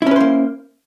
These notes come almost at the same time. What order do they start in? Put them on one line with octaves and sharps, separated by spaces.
E4 C#4 B4 C5 A#3